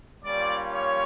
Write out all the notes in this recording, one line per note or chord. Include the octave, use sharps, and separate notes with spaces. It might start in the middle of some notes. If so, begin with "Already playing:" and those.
G3 A#3 C#4 F4 D5
C#5